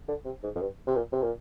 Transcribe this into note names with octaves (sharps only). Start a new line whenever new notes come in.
D3
C3
G#2
F2
G2
C3
A#2
C3
A#2